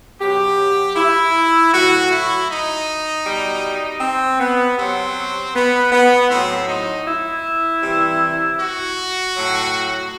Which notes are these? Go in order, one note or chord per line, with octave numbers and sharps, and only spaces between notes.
B2 F#3 G4
E4
A2 F#3 F#4
E4
D#4
B2 G3
C4
B3
C3 F#3 C4
B3
B3
A2 F#3 C4
D#4
E4
C3 E3 G3
F#4
A2 F#3